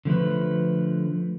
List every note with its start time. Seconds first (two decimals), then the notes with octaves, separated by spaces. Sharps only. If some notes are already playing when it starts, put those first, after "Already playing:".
0.05 D3 F3 A3 B4